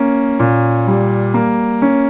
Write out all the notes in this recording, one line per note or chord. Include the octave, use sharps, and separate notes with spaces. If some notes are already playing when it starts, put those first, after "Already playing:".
Already playing: A#3 C#4
A#2
G3
A#3
C#4